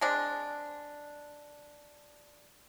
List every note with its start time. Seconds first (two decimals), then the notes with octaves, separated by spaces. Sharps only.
0.01 G#3 C4 D4